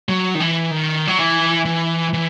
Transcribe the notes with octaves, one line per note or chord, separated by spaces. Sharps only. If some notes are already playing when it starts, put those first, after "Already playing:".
F#3
D#3
E3
D#3
F#3
E3
E3
E3